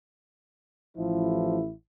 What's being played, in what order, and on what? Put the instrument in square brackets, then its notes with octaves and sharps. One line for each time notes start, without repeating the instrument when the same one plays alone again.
[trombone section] A1 E4 [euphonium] F3